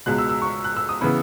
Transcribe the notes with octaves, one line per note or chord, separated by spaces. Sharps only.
C#2 B2 G#3 F#6
E6
E6
C#6
F#6
E6
D#6
C#3 E3 B3 B5